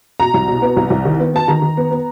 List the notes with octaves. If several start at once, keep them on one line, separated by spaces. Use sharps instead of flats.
B2 A#5
C2
B2
B3
C2
C2
D#3
B3
B3 A5
D#3 A#5
D#3
B3
B3